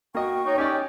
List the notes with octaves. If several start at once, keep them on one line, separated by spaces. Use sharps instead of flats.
A#3 F#4 D#5 G5 C#6
D#4 C#5
C#4 D#4 G4 D5